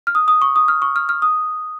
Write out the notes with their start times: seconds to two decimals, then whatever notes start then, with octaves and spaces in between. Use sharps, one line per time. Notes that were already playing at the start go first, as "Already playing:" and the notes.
0.07 F6
0.15 D#6
0.28 D#6
0.42 C#6
0.56 D#6
0.68 F6
0.82 C#6
0.96 F6
1.09 F6
1.22 D#6